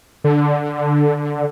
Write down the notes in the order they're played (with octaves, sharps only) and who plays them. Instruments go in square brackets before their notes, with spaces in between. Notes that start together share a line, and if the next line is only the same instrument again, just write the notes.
[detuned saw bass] D3